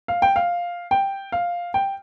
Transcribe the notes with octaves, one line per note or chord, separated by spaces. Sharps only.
F5
G5
F5
G5
F5
G5